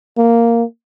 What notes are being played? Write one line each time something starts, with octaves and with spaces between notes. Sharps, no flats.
A#3